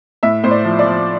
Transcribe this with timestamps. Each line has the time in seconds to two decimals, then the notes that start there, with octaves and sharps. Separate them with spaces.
0.23 A2 E5
0.44 A2 C5
0.51 D5
0.65 F3
0.79 D5
0.86 F3